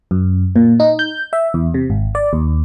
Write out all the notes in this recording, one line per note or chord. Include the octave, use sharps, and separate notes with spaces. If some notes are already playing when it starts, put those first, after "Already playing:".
F#2
A#2
D#4
G6
E5
E2
C3
G#1
D5
D#2